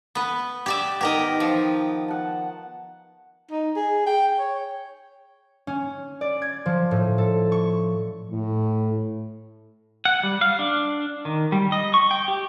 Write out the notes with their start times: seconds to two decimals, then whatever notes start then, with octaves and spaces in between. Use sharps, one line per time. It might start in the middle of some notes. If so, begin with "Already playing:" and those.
0.15 B3 B4
0.66 G4 D5 E5
1.01 D#3 B3 G4 A#4 D#5
1.40 F3
2.08 F#5 A5
3.51 D#4
3.76 G#4
4.06 G5
4.39 C#5
5.67 C#4
6.21 D5
6.42 G#6
6.66 F3
6.91 A2
7.18 A4
7.52 C#6
8.31 A2
10.05 F#5
10.23 G3
10.41 F5
10.59 D4
11.25 D#3
11.52 G3
11.72 D#5
11.94 C#6
12.11 G5
12.28 G4